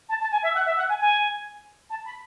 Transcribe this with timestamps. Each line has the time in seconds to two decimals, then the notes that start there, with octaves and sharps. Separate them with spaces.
0.09 A5
0.20 A5
0.31 G#5
0.42 E5
0.54 F#5
0.65 E5
0.76 F#5
0.88 G#5
0.99 G#5
1.89 A5
2.05 B5